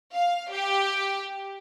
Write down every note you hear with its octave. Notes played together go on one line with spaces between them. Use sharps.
F5
G4